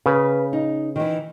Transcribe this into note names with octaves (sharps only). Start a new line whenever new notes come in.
C#3 B4
D#4
D#3 E3